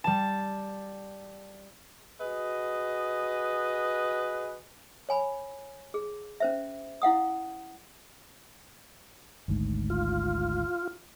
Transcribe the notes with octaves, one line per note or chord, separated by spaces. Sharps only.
G3 A5
F#4 G#4 B4 D#5
C#5 G#5 B5
G#4
C#4 C5 E5
E4 F5 F#5 D#6
G#1 D2 G#2
F4